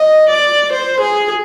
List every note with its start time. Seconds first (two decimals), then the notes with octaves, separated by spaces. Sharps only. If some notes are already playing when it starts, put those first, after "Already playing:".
Already playing: D#5
0.30 D5
0.73 C5
1.01 G#4